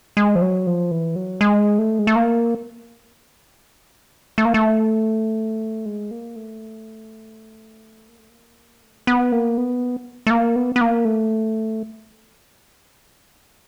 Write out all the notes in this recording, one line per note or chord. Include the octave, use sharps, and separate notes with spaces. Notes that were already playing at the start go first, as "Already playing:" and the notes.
G#3
F3
F#3
F3
E3
F#3
G#3
A3
G#3
A3
A#3
A3
A#3
A3
G#3
A#3
A3
A#3
A3
A#3
A3
B3
A#3
B3
A3
A#3
B3
B3
A#3
A3